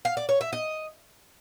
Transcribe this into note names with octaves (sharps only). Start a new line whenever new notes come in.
F5
D5
C#5
E5
D#5